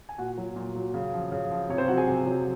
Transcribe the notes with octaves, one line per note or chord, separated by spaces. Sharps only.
G#5
A#2 F#4 F#5
F#3
A#2
F#3
C#3
F3
C#3
F3
C3 C#5
C4 C5
F#3 F#4 F#5
G#4 G#5
C3
F#3